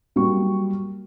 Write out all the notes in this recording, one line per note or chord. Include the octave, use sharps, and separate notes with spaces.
F#3 G3 A#3 C#6